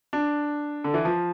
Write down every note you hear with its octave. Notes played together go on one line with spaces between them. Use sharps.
D4
D3
E3
F3